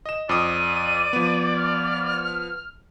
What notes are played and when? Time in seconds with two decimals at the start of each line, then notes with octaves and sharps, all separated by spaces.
0.06 D#5 E7
0.29 F2 D5 D6 D#6 D#7
1.13 F3 B3
1.56 F6